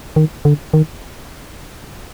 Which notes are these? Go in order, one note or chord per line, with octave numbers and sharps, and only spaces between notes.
D#3
D3
D#3